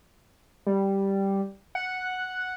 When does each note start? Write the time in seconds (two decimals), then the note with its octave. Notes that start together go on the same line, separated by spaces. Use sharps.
0.67 G3
1.75 F#5